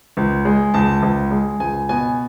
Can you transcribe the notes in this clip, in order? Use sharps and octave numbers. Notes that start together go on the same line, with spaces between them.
C#2
G#3
C#2 A5
C#2
G#3
C#2 G#5
B2 G#5